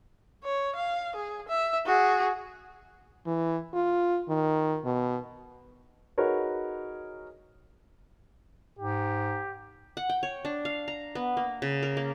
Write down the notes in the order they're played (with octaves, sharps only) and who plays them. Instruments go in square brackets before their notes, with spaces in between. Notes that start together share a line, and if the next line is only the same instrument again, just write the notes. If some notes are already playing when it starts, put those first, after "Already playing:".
[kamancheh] C#5
F5
G#4
E5
F#4 G#4
[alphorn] E3
F4
D#3
B2
[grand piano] D#4 F#4 G#4 A#4 B4 C#5
[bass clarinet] G#2 [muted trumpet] G4
[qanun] F#5
G5
C#5
D4
F5
A#5
B3
A#3
C#3
A#4
A#3